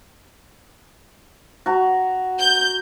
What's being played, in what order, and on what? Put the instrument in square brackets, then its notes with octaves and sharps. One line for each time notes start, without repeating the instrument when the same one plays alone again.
[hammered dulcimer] F#4 A#5
[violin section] G6